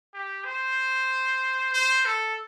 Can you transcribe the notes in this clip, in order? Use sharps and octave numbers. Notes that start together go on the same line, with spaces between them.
G4
C5
C5
A4